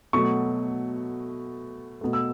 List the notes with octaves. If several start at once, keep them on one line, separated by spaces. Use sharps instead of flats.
B2 F#3 A3 C#6
B2 A3
E6